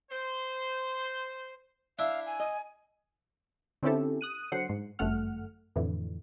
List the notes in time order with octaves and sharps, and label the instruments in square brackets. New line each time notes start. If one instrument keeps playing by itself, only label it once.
[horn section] C5
[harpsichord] D4 E4 E5 [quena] F5
[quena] G#5
[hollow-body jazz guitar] D#5
[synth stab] D3 C4 C#4 E4 G4 A4
D#6 F#6 D#7
D3 F#3 C5 F#5 C7 C#7
G#2
G1 F#2 A3 F#5 F6
F2 A2 D3 E3